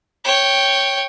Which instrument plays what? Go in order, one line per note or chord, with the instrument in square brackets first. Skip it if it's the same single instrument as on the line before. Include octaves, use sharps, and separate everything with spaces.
[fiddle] C#5 G5